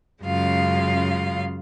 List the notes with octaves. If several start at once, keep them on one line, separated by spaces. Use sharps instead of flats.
F#2 C#3 G#3 F4 F5